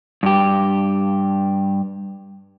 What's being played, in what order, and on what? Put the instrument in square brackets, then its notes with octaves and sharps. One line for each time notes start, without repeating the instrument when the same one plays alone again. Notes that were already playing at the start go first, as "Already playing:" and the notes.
[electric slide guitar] G2 G4